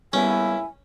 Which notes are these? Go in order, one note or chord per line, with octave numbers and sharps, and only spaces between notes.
C#2 G3 A#3 B3 C#4 E4 G#5